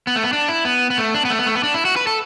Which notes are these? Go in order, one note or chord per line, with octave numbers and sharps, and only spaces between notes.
B3
A3
B3
D4
E4
B3
B3
A3
D4
B3
A3
B3
A3
B3
D4
E4
F#4
B4
A4